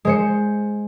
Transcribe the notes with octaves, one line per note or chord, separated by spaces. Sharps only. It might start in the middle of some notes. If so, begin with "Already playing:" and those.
G#3 C5 C#7